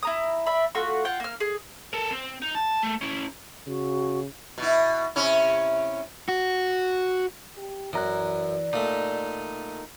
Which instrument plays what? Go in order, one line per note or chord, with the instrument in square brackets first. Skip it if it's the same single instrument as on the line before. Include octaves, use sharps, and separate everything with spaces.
[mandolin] E4 A#5 D#6
D5 E5 B5
A3 F4 F#4 C#6
F4 F#5 G5
A#3 F6
G#4
[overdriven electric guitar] A4 A#4
C4
D#4
A5
A3
C#4 E4
[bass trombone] C#3 [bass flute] F#4
[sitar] B2 E4
C3 C#4 E4
[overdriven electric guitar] F#4
[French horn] G4
[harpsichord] F#2 [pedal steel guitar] E3 A#5 F#6 [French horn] D5
[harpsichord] A#2 A3 [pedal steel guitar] D#4